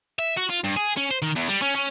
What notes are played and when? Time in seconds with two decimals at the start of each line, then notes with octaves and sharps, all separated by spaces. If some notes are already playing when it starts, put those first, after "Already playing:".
0.19 E5
0.37 F#4
0.49 F4
0.64 G2
0.76 G#4
0.97 C#4
1.11 C5
1.22 D#3
1.36 E2
1.49 G3
1.62 C#4
1.75 C#4